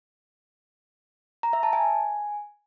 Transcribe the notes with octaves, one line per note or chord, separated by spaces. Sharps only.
A#5
E5
A5
G#5